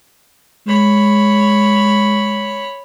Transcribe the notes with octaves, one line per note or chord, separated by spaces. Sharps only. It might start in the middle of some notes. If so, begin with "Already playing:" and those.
G#3 C#5 B5